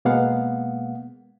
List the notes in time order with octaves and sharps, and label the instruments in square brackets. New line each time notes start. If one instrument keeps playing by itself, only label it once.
[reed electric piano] B2 G#3 A#3 B3 F5 F#5